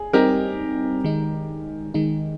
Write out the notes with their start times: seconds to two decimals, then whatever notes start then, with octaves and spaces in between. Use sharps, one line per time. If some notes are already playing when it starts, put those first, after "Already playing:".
Already playing: G#4
0.13 G3 C4 D#4 G4 A#4
1.04 D#3 G#3 D#4
1.94 D#3 G#3 D#4